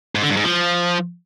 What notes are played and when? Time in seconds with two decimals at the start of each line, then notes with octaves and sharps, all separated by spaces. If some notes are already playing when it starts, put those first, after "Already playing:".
0.15 G#2
0.22 D3
0.30 G2
0.37 G#2
0.44 F3